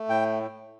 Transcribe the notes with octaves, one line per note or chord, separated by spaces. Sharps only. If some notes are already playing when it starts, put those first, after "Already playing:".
Already playing: A3
A2 G5